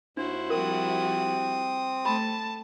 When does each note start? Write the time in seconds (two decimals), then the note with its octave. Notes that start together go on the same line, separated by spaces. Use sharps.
0.17 D#2 D4 E4 F#4 C5
0.50 F3 G3 C4 A#4 D#6
2.05 A3 A5 B5